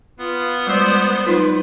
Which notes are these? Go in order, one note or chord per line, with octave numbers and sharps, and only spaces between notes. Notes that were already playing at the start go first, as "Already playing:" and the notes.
B3 F4
G3 G#3 C5 D5
F#3 D#4 F4 B4